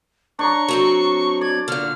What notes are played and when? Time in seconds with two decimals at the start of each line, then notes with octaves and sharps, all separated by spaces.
0.39 D4 C#5 A#5 C#6
0.68 F#3 C4 A4
1.41 D5 G#6
1.68 A#2 D3 F6